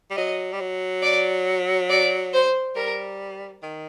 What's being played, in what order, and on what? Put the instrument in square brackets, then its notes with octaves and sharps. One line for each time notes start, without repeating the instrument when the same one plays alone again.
[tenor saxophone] G3
[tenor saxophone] F#3 [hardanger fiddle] D#5
[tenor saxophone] G3
F#3
[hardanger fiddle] D5
D5
C5
[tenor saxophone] G3 [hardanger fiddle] A#4
[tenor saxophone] D#3